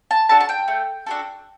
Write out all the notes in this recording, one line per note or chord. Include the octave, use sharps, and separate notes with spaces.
A5
D4 F#4 A4 A5
A5
G5
A3
D4 F#4 A4